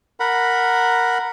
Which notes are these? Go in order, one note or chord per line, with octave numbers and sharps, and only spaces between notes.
A#4 F#5 B5